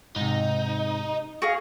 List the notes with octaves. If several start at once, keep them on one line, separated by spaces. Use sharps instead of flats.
G#2 C3 D#4
F#4 G#4 F5